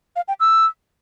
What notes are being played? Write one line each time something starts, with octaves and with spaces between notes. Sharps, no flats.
F5
G5
E6